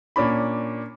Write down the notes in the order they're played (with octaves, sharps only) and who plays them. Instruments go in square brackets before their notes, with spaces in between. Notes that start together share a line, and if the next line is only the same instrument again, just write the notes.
[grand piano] A#2 C#4 D4 B5